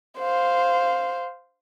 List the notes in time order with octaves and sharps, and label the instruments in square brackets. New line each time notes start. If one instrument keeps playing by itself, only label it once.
[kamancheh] C5 F5